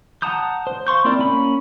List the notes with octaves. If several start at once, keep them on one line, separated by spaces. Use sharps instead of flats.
F#5 A5 A#5 D#6 G6
C5
F5 C6 C#6 G6
A#3 C4 E4 A#4 D5
A#3 C#4 B5